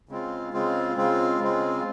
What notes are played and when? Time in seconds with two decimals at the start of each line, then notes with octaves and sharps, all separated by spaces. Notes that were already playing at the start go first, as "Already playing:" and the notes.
0.09 C#3 G#3 C4 F4
0.53 C#3 G#3 C4 F4
0.96 C#3 G#3 C4 F4
1.40 C#3 G#3 C4 F4